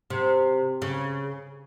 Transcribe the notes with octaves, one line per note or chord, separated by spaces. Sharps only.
C3
C#3